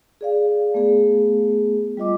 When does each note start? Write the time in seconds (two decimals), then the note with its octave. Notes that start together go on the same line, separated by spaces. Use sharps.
0.21 G#4 D5 F5
0.74 A3 B3 G#4
1.97 G3 F4 D#5 D6